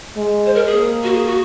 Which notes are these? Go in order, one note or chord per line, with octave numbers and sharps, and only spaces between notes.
G#3
C5
A#4
G#4
A#3
F#4
G#4
F#4